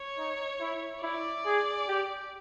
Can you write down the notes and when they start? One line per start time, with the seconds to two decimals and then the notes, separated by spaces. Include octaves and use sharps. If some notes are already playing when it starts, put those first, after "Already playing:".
Already playing: C#5
0.18 D#4
0.61 E4
1.03 E4 D5
1.46 G#4
1.88 G4